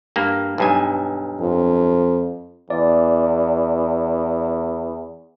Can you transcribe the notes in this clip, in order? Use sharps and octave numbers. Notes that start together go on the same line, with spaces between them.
G2 A#3
B1 G2 G#5
F2
E2 D5